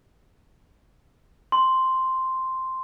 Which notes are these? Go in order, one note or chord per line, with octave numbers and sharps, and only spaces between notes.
C6